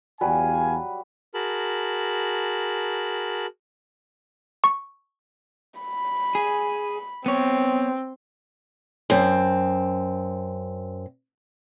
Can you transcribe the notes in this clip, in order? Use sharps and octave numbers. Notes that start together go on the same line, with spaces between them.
E2 F#3 G3 B4 F5 G#5
F#4 G#4 A#4 A5 B5
C#6
B5
G#4
B3 C4 C#5
F#2 C4